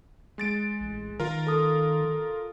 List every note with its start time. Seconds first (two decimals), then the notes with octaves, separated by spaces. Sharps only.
0.38 G#3 A6 D7
0.80 A1
1.20 D#3 F4 A#4
1.47 A4 D#6